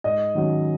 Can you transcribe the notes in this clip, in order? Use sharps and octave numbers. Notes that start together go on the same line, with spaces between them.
G#2 D#5
D#3 F#3 C#4